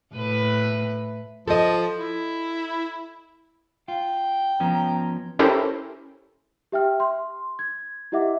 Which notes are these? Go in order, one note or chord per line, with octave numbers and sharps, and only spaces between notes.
A2 B4
F3 A4 D#5
E4
F4 G5
F3 B3 C#4 A#5
C#4 E4 G4 A4 A#4 C5
G4 E5 G5 F6
C6
G#6
E4 G4 D#5 E5 F#5 D6